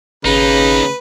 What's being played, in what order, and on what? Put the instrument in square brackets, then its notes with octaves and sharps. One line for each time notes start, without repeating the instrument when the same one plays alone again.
[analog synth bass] G#1 [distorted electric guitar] D#2 D#4 [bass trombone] C#3 [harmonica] B4